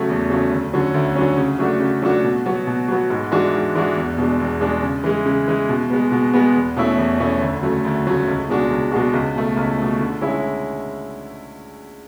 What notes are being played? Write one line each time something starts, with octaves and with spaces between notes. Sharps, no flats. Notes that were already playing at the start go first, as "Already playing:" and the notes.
Already playing: C#3 F#3 A3
E2
C#3 F#3 A3
D2
D3 F#3 C#4
D2
D3 F#3 C#4
C#3
F#3 A3 D4 F#4
C#3
F#3 A3 D4 F#4
B2
F#3 B3 F#4
B2
F#3 B3 F#4
G#2
E3 G#3 D4 F#4
G#2
E3 G#3 D4 F#4
E2
B2 G#3 D4
E2
B2 G#3 D4
C#3
E3 G#3
C#3
E3 G#3
B2
G#3 B3
B2
G#3 B3
E2
B2 A3 C#4 E4
E2
B2 A3 C#4 E4
D2
C#3 F#3 A3
D2
C#3 F#3 A3
C#2
B2 G#3 D4 F#4
C#2
B2 G#3 D4 F#4
C#2
B2 A3
C#2
B2 A3
D3
G#3 C#4 E4